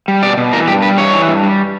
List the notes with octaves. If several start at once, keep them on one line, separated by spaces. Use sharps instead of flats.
G3
B2 D5
B2
E3 A#4
G2 G4
G3 B4
G2 C#5
E3
G2
G3